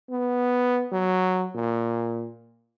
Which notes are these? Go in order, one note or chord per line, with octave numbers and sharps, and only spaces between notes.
B3
F#3
A#2